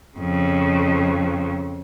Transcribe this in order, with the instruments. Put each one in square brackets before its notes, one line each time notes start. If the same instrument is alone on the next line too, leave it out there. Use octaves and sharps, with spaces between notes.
[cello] F2 C#3